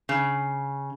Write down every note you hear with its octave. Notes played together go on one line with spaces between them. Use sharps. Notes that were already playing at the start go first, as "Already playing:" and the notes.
C#3